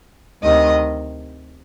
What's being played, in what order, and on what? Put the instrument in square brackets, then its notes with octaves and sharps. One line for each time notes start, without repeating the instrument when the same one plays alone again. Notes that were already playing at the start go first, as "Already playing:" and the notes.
[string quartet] D2 C3 D#3 D#5